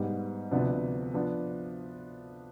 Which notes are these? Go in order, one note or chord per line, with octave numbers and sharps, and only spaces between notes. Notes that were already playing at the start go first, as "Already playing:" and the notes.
Already playing: G#2 G3 B3
D2 C3 F3 B3 D4
F3 B3 D4